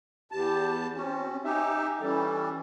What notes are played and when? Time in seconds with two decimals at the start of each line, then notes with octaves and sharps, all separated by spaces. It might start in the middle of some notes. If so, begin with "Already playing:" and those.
0.32 E2 G4 A5
0.96 C4 C#4 F#4
1.44 D#4 G4 E5 G#5
2.01 E3 G3 C#4 A4